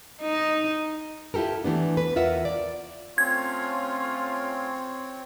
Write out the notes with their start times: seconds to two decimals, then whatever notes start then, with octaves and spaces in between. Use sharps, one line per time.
0.22 D#4
1.34 E4 F4 G4 A4 A#4
1.64 E3 A3 B3 D4
1.97 B4
2.15 E2 E3 F4 A#4 E5 F#5
2.45 D5
3.18 A3 C4 C#4 F4 C#5 G#6